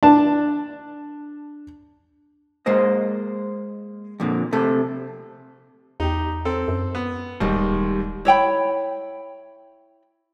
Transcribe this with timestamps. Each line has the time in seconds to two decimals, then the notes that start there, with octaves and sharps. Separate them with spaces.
0.03 D4 A5
2.66 G#3 A#3 C5 D#5
4.20 F2 A#2 D3
4.53 C3 A3 A4
6.00 E2 D#4 G4
6.45 C4 A4
6.68 F#2
6.95 B3
7.40 D1 D#2 G#2 G3 G#3
8.25 E4 C#5 G5 B5